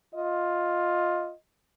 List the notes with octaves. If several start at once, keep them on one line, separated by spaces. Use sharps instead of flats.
F4 D#5